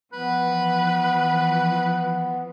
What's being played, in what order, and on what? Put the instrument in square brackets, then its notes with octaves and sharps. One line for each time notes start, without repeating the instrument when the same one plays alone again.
[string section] E3 F3 [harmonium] B3 [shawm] B4